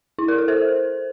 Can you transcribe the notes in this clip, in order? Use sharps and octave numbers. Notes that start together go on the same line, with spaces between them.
E4
A#4
A4
C5